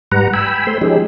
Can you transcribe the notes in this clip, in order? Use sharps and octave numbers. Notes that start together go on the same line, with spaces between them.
G#2 G3 B4 F#5 A#5
G5 G#5 B5 E6
A3 C5 C6
F3 G#3 C#4 D#4 G4 G#4